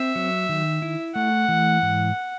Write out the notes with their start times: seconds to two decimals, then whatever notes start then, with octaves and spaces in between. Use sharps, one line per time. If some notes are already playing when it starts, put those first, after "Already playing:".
Already playing: C4 E5
0.15 F#3
0.49 D#3
0.82 E4
1.15 A3 F#5
1.48 E3
1.82 G#2